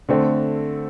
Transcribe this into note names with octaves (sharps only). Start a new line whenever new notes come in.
D3 A3 C4